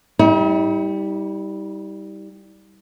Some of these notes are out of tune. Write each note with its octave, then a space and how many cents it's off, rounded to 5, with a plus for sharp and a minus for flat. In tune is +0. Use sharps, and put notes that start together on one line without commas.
G3 +0 D#4 +45